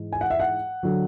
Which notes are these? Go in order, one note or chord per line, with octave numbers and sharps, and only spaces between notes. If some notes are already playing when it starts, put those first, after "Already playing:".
Already playing: G#2 E3
G#5
F#5
E5
F#5
D3 F#3